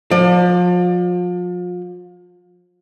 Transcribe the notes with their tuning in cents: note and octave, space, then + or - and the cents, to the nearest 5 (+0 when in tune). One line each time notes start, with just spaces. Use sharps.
F3 +35 D5 +30